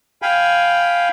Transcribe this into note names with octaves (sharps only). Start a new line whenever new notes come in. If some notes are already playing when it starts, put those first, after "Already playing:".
F5 G5 G#5 B5